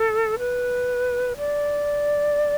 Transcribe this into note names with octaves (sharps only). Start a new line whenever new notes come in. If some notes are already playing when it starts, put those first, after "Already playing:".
Already playing: A4
B4
D5